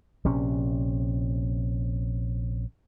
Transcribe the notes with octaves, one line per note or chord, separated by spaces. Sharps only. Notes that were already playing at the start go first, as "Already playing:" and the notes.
A#1 C3 C#4